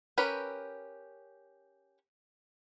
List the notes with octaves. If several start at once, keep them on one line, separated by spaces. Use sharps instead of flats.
C#4 G4 A#4 B4